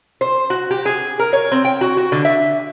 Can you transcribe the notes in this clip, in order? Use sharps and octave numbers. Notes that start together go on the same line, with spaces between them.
C5
F#4
G4
G#4
A#4
C#5
C4
G5
F#4
F#4
D3
E5